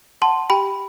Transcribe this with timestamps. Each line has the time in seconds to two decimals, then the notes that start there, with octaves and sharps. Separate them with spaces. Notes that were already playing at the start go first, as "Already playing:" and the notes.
0.22 F#5 A5 C6
0.50 G4 G5 B5